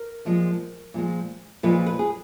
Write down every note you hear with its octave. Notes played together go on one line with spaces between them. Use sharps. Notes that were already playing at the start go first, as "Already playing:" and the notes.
Already playing: A#4
A#2 F3 G#3
A#2 F3 G#3
A#2 F3 G#3 B4
B4
G#4